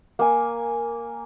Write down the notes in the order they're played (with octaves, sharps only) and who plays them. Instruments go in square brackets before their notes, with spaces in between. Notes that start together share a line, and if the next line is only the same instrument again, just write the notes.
[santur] A#3 G#5